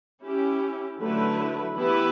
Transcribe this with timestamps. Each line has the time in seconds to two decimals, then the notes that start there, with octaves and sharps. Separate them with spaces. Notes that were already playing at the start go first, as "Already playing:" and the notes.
0.23 C#4 E4 G4
1.00 D3 F#3 A3 E4 B4
1.76 E3 B3 E4 G4 B4